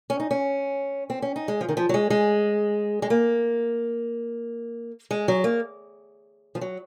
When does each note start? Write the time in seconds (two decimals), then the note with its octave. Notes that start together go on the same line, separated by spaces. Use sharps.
0.10 C#4
0.20 D#4
0.31 C#4
1.10 C4
1.22 C#4
1.36 D#4
1.48 G#3
1.61 F3
1.69 D#3
1.77 F3
1.89 F#3
1.94 G#3
2.10 G#3
3.02 G#3
3.10 A#3
5.11 G#3
5.28 F#3
5.44 A#3
6.55 F3
6.61 F#3